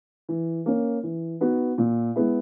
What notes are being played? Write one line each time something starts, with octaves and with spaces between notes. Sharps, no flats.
E3
A#3 C#4
E3
B3 D#4 F#4
A#2
G#3 B3 E4